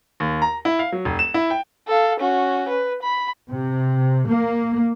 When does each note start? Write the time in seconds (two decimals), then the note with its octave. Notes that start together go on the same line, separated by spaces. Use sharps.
0.20 D#2
0.42 A#5
0.65 E4
0.79 F5
0.92 F#3
1.05 F1
1.19 E7
1.34 E4
1.50 G5
1.88 A4 F5
2.20 C#4 F#4
2.69 B4
3.03 B5
3.51 C3
4.28 A#3